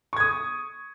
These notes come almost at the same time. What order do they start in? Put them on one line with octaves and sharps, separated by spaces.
C#6 G#6 D#6